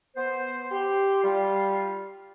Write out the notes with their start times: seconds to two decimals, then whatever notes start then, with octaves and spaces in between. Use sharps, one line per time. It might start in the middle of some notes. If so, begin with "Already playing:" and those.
0.15 B3 C5
0.71 G4 C6
1.22 G3 F4